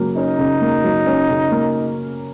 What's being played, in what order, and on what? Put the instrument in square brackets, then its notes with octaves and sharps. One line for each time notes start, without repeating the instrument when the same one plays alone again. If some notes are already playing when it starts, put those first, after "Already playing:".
Already playing: [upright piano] C#3 F#3 A#3
[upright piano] C#4 [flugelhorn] D#4
[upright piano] C#3
A#3
F#3
C#4
C#3
A#3